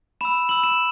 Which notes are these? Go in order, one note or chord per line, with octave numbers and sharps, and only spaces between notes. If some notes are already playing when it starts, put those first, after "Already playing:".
B5 E6 E7
B5 E6 F#7
E7